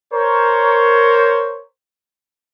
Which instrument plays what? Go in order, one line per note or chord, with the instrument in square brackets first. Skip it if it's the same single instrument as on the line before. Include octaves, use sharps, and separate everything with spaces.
[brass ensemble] A#4 C5 C#5